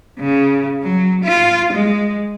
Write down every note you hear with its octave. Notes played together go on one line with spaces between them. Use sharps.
C#3
F#3
F4
G#3